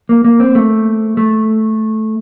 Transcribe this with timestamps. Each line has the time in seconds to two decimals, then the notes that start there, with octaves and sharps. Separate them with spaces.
0.09 A#3
0.25 A#3
0.40 C4
0.55 A3
1.17 A3